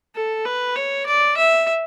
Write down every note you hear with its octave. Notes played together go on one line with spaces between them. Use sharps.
A4
B4
C#5
D5
E5